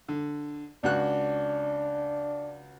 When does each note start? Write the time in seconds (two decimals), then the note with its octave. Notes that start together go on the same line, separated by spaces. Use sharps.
0.09 D3
0.83 C#2 D4 F#4 F#6